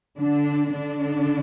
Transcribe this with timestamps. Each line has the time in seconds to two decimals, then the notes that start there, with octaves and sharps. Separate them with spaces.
0.19 D3 D4
0.75 D3 D4